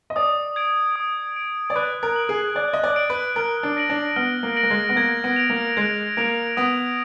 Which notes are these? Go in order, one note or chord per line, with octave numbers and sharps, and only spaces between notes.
D#5
D5 D#6
G#6 D7
D#6
G#6 D7
D5
B4 F#6
A#4
D7 F#7
G#4
D5 F#6
D#5
D5
D7 F#7
B4
A#4 F6
D4
A#6 D7 F#7
D4
B3 F6
A#3
A#6 D7 F#7
A#3
G#3
B3
A#3 G#6
B3
D7 F7
A#3
G#3 G#6
A#3 D7 F7
B3 D#6